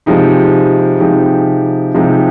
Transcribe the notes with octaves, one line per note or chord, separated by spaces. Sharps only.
C3 F3 G#3 D#4 G4
C3 F3 G#3 D#4 G4
C3 F3 G#3 D#4 G4